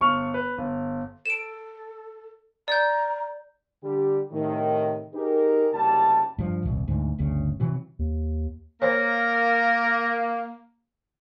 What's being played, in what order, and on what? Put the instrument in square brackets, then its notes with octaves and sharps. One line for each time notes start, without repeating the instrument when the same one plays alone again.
[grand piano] G1 C#6 F6 F7
B4
G1
[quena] A4 [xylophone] D7 E7
[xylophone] D5 G6 [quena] A#5
[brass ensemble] D3 G3 G4
A2 C3 D#3
D#4 G4 G#4 A#4
F#1 C#2 C3 G3 A5
[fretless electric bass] G2 F3
D#1 C2
D2 G#2
G1 D2 C#3
C3 E3 F#3
[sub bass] D#2
[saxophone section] A#3 [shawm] A#4 [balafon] C5 C#5